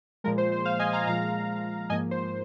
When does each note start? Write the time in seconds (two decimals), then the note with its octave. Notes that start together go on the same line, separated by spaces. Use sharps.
0.24 A#2 F3 G#3 A#4
0.38 C5
0.52 C5
0.65 C5 F5
0.79 D#5 G#5
0.93 F5 A#5
1.07 A#2 F3 G#3 F5 A#5
1.90 G#2 F3 A#3 D#5 G#5
2.11 C5